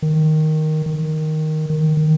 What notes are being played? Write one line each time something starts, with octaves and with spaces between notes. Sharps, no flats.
D#3
D#3
D#3
D#3